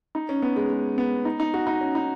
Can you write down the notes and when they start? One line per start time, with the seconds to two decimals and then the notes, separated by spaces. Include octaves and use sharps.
0.15 D#4
0.29 C#4
0.42 B3
0.56 G#3
0.70 G#3
0.98 B3
1.25 D#4
1.40 D#4
1.54 F#4
1.67 D#4
1.81 C#4
1.95 D#4